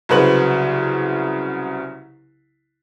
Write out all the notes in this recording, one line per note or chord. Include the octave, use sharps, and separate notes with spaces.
C2 C#3 F#3 B4 C5 F#7